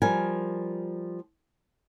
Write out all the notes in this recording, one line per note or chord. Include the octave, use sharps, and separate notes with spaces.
F3 G3 A#4 G#5